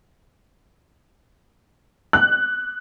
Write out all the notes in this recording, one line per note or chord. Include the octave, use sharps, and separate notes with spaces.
F#6